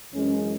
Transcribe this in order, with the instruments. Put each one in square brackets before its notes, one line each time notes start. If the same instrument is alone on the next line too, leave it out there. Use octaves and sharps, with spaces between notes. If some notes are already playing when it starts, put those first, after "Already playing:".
[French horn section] F#2 E3 G#3 C#4